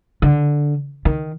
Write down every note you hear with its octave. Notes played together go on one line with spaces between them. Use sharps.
D3
D#3